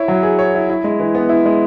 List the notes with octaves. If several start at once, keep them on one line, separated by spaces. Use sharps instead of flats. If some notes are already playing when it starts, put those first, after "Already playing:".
Already playing: E4 C#5
F#3
G#4
C#5
E4
E4
G#3
E3
B3
E4
G#3